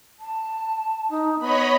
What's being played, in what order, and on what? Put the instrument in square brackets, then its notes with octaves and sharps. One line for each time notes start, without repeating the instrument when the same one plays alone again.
[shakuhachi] A5
D#4
[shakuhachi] B3 [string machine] C#5 D#5 B5